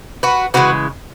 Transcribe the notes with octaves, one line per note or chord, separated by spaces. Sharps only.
F#4 B4
C#3 E3 G#3 F#4 B4